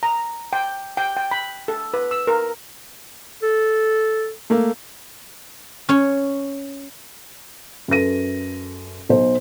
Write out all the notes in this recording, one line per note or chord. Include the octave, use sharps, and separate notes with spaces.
A#5
G5
G5
G5
B5
A4
B4
E6
A#4
A4
A3 A#3
C#4 C#5
F#2 A4 B4 A#6 D#7
B1 C5